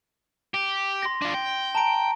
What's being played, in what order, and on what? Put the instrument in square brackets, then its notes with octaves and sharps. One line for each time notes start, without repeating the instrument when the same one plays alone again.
[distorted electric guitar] G4
[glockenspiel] C6 A#6
[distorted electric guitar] D4 F4
G5
[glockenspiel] A5 A#5 D7